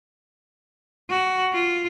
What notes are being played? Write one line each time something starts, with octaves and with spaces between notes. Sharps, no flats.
F#4
F4